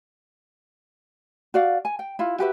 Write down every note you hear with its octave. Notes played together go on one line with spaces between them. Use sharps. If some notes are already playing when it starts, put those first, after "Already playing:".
F#4 D5 F5
G#5
G5
E4 F4
F#4 G4 B4 E5